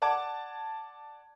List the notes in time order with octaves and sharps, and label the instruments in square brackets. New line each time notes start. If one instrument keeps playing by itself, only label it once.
[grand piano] D5 F#5 A5 D6 G#6 D7